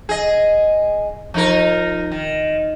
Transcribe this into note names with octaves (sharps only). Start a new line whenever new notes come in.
G#4 D#5
F3 D#4 A#4
D#3